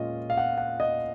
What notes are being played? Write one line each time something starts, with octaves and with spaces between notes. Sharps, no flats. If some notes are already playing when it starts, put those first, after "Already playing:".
Already playing: A#2 G#3 C#4 F4 D#5
F5
F#5
F#5
D#5